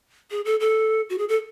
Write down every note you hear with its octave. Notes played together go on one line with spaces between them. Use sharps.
G#4
A4
A4
F#4
G#4
A4